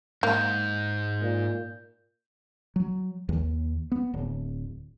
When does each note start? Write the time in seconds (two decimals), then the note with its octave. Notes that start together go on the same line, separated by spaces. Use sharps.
0.23 G#2 A#3 G6
1.22 A#2
2.76 F#3
3.29 D#2
3.92 B3
4.14 D1